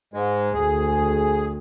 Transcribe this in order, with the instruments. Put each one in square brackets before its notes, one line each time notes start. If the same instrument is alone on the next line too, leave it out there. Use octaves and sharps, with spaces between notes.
[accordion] G#2 G#3
[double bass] D2 [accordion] G#4